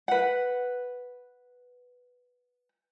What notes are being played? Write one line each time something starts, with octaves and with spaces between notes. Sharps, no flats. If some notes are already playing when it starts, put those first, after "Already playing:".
B4 F#5